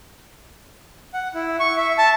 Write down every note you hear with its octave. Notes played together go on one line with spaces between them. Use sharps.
F#5
E4
C#6
E5
A5